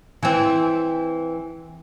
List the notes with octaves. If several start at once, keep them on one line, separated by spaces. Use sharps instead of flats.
E3 C4